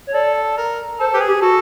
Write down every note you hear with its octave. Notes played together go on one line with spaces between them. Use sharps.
C#5
A4 D5
A#4
A4 C5
G4 B4
G#4
G4
F#4 A4